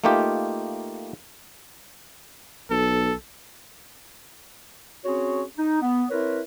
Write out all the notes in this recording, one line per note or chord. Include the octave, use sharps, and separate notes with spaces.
A3 A#3 D#4 F4 G4
B1 A4
C4 C#4 F#4 G#4 C#5
D#4
B3
C4 E4 A#4 B4 C#5